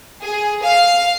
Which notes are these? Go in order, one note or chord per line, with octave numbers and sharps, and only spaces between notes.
G#4
F5